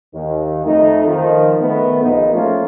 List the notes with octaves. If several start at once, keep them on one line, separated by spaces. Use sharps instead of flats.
D#2 D#3
F2 A3 D#4
D#3 F3
D#3 A3 B3
A#1 D#4
F3 A3 A#3 C#4 F4